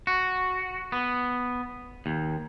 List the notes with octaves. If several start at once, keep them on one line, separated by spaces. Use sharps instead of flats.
F#4
B3
D#2